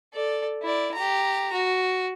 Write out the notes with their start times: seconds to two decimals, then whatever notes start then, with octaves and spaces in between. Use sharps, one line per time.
0.14 A4 D5
0.63 E4 D5
0.94 G4 A#5
1.53 F#4